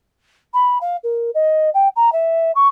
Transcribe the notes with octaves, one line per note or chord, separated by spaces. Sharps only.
B5
F5
A#4
D#5
G5
A#5
E5
C#6